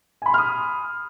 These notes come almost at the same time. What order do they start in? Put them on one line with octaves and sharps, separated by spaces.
G#5 B5 C6 F6 D#6